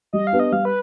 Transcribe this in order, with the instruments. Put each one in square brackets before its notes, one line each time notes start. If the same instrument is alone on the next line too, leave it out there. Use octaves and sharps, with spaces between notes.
[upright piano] G3 [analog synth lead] D#5
[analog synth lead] F5
[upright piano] B3 D4 G4
[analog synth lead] D#5
[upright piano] G3 [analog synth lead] F5
[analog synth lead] B4